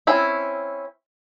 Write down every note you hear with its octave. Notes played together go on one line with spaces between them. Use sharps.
C4 C#4 E4